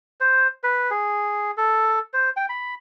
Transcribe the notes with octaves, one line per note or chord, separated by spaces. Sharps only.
C5
B4
G#4
A4
C5
G5
B5